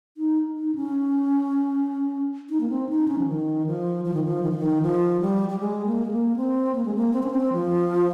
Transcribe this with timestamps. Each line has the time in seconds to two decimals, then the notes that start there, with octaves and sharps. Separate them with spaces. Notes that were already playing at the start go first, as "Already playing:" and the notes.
0.17 D#4
0.56 D#4
0.75 C#4
2.50 D#4
2.61 A#3
2.70 C4
2.89 D#4
3.08 C#4
3.18 F3
3.27 D#3
3.66 F3
4.05 F3
4.14 D#3
4.25 F3
4.43 D#3
4.51 F3
4.58 D#3
4.82 F3
5.21 G3
5.49 G3
5.60 G#3
5.86 A#3
6.05 G#3
6.11 A#3
6.36 C4
6.75 A#3
6.85 G#3
6.95 A#3
7.13 C4
7.23 C#4
7.31 C4
7.53 F3